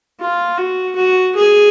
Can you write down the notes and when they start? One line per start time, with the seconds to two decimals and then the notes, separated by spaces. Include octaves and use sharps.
0.21 F4
0.58 F#4
0.96 F#4
1.35 G#4